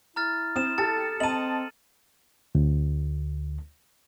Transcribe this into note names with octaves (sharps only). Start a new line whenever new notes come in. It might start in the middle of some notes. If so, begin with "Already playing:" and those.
E4 A#5 F6 A6
C4 D#6 E7
G4 A4 A6
C4 D#5 A5 D#7 F#7
D2